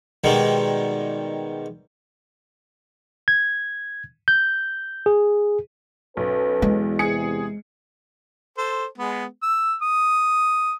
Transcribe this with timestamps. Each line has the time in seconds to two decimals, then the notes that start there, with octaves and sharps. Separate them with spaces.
0.24 B2 D#3 G3 G#3
3.28 G#6
4.28 G6
5.06 G#4
6.17 B1 C#4 A4 B4
6.62 E2 G#3
6.99 C3 G#4 C#7
8.58 A4 C5
8.98 G#3 B3
9.43 E6
9.82 D#6